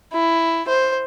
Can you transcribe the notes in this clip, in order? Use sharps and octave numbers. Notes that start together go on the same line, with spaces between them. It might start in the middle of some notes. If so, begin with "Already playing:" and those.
E4
C5